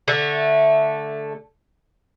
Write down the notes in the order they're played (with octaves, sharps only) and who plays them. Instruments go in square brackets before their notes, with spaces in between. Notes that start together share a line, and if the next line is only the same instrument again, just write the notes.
[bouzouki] D3 A3 E5